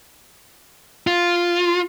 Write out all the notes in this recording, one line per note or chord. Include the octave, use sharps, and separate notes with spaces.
F4